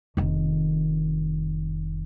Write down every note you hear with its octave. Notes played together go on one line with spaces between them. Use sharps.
F1 D#3